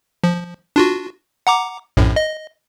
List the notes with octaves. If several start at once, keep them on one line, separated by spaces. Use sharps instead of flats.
F3
D4 F4 F#4
F#5 A#5 D6
A#1 F#2 A2
D#5